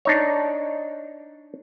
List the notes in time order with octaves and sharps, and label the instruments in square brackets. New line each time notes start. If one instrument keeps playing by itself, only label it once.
[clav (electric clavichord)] D4 D#4 C#5